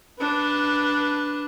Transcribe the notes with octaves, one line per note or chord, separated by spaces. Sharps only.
D4 B4